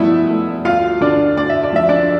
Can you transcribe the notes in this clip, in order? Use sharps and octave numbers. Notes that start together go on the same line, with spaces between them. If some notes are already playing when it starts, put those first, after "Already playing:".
Already playing: G2 F3 A3 B3 E4 E5
A3
D2 F4 F5
D3 D4 D5
D2 D5
E5
D5
F3 E5
D4 D5